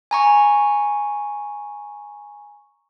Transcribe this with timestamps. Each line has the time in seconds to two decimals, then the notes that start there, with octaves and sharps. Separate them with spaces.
0.11 G#5 A#5 C#6